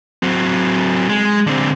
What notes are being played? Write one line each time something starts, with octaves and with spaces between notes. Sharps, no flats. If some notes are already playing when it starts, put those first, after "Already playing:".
F#3 C4
G#3
D3 C4